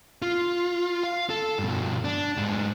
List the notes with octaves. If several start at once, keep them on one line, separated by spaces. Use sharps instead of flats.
F4
F5
A4
G2 B2
D4
G#2 D4